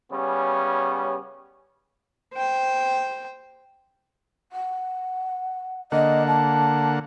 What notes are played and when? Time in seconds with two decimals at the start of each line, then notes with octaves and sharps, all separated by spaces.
0.11 C#3 G3 B3 C#4
2.34 C5 G5
4.52 F#5
5.92 D3 A#3 D#5 F#5
6.28 A5